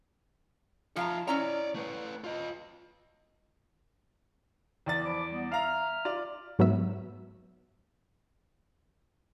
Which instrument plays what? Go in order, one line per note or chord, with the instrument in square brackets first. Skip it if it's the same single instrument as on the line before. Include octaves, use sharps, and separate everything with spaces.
[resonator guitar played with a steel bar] F3 F5 A#5 [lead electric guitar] F4 E5
[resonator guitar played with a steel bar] C#4 E4 A#5 [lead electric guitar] C#5 D5
[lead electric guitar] A3 B4
F4 D#5
[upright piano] E2 D5 A6
[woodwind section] F3 B5 D6
G3 B3
[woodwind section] E5 F6 [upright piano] F5 A#5
[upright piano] F4 D5
[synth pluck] G#2 F#3 B3 E5